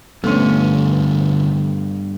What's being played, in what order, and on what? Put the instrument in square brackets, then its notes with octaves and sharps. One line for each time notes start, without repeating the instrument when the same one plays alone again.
[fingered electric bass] G2 [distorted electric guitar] D3 F3 [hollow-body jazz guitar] A3 C#4 [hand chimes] B3 C6